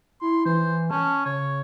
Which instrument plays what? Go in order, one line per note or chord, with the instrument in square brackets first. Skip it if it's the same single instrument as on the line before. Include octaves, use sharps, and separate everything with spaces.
[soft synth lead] E4 [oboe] C6
[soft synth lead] E3 [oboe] C5
[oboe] C#4 [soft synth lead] A5
[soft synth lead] C#3 [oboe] C#5